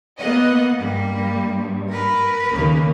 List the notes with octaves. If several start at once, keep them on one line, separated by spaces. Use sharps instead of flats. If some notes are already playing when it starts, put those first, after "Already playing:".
A#3 B3 D#5 F#5
G2 G3 A#3
G2
A#4 B4
D#2 C#3 A#3